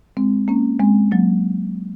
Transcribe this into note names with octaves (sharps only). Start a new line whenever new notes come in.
G#3 C4
A#3 C#4
G#3 C4
F#3 A#3